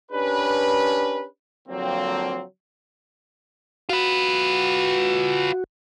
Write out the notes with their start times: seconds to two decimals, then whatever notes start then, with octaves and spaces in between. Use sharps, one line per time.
0.11 C#4 D4 G4 A#4 B4
1.68 D3 F3 F#3 A#3 C4
3.89 F4 F#4 B4